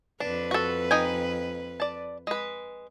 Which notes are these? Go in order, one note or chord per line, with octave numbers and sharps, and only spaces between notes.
F2 D4 B4
F#4 A4
D#4 G5 G#5
D5 A5
G#3 B4